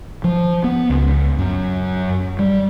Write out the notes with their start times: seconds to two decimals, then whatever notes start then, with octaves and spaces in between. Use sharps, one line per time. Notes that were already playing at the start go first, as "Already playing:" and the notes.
0.24 F3
0.64 B3
0.90 C#2
1.39 F#2
2.39 G3